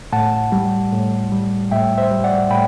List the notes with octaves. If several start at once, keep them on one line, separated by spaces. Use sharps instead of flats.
A2 F#5 A5
G3
A2
G3
A2 E5 G5
C5 E5
G3
D5 F#5
A2 G5 B5